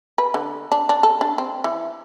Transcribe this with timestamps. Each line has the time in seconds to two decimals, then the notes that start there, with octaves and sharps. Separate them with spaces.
0.18 B4
0.34 D3
0.72 D4
0.89 D4
1.03 A4
1.21 D4
1.38 C4
1.64 E3